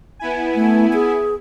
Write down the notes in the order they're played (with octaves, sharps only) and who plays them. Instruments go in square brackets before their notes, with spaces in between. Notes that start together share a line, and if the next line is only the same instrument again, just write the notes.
[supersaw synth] B3 E4 G#5
[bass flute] A3
G#4